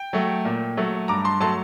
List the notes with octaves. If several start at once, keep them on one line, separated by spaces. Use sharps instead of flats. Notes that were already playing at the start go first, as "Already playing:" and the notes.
Already playing: G5
F#3 A3
A#2
F#3 A3
G2 A#5 D6
A5 C6
F#3 A3 A5 C6